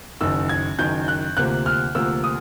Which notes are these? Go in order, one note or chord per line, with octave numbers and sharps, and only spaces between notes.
F#1 F#2 D#3 E6
G#6
F#1 F#2 D#3 G6
F#6
D2 C3 F3 A#3 F#6
F6
D2 C3 F3 A#3 E6
D#6